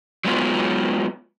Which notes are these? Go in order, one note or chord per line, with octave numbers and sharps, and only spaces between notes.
F#3 G#3 B3 F4